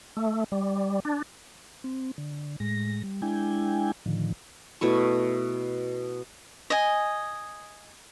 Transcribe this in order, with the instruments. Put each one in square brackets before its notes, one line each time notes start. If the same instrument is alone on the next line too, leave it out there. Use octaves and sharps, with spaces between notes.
[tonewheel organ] A3
G3
D4
C4
D3
A2 G#3 A#6
G3
G#3 D4 E4 G5 G#5
A2 D3 D#3 F3
[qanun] B2 A3 E4 C#6
[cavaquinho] D#5 G#5